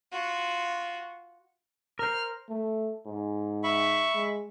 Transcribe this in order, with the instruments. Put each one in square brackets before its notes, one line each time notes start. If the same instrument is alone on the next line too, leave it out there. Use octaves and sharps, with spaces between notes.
[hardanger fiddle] F4 F#4
[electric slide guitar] A#4 C5 [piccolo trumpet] F6
[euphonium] A3
G#2
[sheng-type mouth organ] E5 B5 C#6
[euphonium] G#3